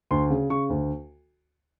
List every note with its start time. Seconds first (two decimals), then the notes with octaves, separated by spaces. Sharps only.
0.11 D2 C6
0.30 C#3
0.50 C#3 C#6
0.70 D2